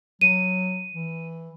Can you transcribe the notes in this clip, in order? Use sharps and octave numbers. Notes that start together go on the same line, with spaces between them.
F#3 D#7
E3